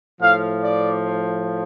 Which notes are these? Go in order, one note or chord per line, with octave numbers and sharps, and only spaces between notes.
A2 F3 F5
D5